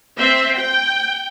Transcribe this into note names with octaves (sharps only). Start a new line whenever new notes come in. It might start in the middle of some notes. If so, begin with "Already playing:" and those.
C4 C5 E5
G5